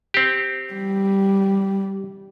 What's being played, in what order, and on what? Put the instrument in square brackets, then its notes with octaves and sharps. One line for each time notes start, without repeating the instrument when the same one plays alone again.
[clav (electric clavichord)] C4 G4
[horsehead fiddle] G3